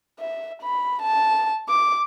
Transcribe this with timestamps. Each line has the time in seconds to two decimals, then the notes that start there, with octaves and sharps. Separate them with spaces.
0.20 E5
0.62 B5
1.02 A5
1.69 D6